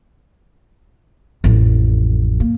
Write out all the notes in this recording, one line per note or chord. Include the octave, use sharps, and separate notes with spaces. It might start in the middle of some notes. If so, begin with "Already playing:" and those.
A1 F2
A#3